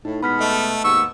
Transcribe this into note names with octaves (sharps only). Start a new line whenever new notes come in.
A2 D#4
B2 G#3 B3 B5 F6 B6
A3 A4 D#5
D#2 G#2 B3 C#6 E6